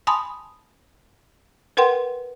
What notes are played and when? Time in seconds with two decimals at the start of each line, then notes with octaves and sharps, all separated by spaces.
0.07 G#5 A5 B5 C6 D#6
1.77 A#4 B4 F#5 G5 C6